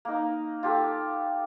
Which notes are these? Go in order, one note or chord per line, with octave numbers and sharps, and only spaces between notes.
A#3 D#4
F4 G4 A4